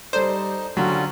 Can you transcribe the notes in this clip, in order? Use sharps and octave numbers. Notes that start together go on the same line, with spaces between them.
G3 D#4 A4 C5 D5
D3 F#3 G3 C#4 F4